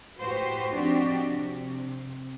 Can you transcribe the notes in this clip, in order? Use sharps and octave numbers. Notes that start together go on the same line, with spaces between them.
A2 F#4 G4 B4 C5
F3 C4 D4 D#4 F#4 G4
C3